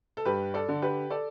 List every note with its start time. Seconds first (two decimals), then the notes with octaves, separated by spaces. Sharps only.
0.17 A4
0.25 G2 G4 B4
0.54 A4 D5
0.69 D3
0.82 G4 B4
1.10 A4 D5